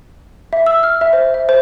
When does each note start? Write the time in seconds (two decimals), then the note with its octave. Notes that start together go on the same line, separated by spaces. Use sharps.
0.53 E5
0.66 E6
0.83 F6
1.01 E5
1.13 C5
1.34 E5
1.49 C5